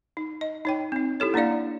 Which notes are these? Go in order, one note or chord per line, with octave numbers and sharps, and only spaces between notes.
D#4
D#5
D#4 C#5 G5
C4 D#4
E4 G4 A4 C#5
A#3 D4 E4 D5 F5